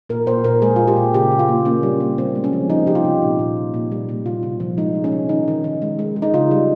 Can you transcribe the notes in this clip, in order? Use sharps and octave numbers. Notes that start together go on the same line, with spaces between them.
A#2 A#4
A#2 C5
A#2 A#4
G#3 G#4
A#2 F4
G4
A#2
C#3 G4
C#3
F4
A#3
A#3 C#4
G3
A#3
C3 C4
G#3
C#4
F3
F3 D#4
C3 G4
F4
C3
A#2
A#2
A#2
A#2
G3
A#2
C3 F4
C3
F3
G#3 D#4
C3
C#4
C3
D#3 D#4
D#3
D#3
G#3
G#3
G#3
D#4
C#3 F4
G3